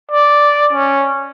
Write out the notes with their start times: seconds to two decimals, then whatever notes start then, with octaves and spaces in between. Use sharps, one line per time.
0.11 D5
0.73 C#4